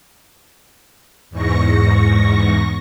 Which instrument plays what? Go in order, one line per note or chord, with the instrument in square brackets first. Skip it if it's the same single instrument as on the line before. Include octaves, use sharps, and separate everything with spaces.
[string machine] E2 G#2 C#6 A#6